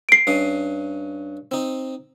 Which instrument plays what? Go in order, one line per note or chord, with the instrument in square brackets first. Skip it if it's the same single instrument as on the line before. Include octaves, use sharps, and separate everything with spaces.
[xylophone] C7 D7
[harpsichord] G2 C#4 D#5
C4 D#4